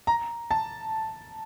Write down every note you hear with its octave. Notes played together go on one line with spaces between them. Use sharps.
A#5
A5